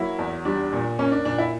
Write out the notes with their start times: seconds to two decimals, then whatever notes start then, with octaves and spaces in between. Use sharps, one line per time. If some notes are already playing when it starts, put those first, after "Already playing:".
Already playing: F#3 A#3 E4
0.19 E2
0.45 G3 D4
0.73 A#2
0.99 A#3 C#4
1.12 D4
1.25 A#2 D4
1.39 E4